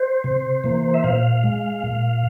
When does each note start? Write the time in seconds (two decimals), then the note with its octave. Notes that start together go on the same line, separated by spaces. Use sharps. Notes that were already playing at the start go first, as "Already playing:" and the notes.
Already playing: C5
0.24 C3
0.64 E3 A#3
0.94 E5
1.04 A#2 F5
1.43 G#3
1.84 A#2